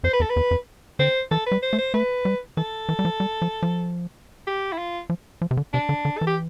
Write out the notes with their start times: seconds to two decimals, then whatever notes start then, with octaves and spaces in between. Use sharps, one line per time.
0.04 F2 C5
0.13 B4
0.20 E2 A4
0.30 B4
0.36 E2
0.51 F2
0.99 D3 C5
1.31 E3 A4
1.46 B4
1.52 G3
1.63 C5
1.73 A3
1.78 C5
1.94 A3 B4
2.25 G3
2.57 E3 A4
2.89 E3
2.99 G3
3.05 F3
3.20 G3
3.42 F3
3.63 F3
4.47 G4
4.72 E4
4.78 F4
5.10 F3
5.42 F3
5.51 C3
5.57 D3
5.73 C3 D4
5.89 D3
6.05 D3
6.18 E3 A4
6.27 G4